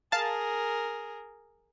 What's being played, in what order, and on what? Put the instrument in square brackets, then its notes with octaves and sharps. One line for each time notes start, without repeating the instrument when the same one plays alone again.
[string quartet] G#4 A#4 [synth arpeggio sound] F5 A5